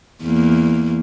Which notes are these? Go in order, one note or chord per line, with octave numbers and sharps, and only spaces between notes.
E2 A#3